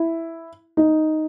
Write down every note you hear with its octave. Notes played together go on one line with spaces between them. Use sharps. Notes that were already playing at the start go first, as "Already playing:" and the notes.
Already playing: E4
D#4